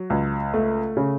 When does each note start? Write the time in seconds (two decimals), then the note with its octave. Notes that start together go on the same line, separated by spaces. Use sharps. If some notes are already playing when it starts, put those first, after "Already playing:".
Already playing: F#3
0.10 C#2
0.54 A3
0.97 C#3